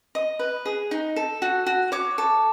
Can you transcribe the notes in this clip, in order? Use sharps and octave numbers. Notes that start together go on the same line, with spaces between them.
D#5
B4
G#4
D#4
A4
F#4
F#4
C#5 D6
A4